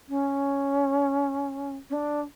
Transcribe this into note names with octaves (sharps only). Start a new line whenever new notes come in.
C#4
C#4
D4